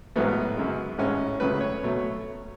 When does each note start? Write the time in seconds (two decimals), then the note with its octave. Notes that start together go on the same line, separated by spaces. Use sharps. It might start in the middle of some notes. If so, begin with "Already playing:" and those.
0.16 A1 G#2 F#3 A3 B3
0.57 F#2 C#3 G#3
0.98 A1 G#2 G#3 C#4
1.40 C#2 C#3 F#3 A3 B4
1.61 C#5
1.83 B2 F#3 A3